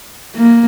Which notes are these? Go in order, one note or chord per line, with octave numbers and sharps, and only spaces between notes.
A#3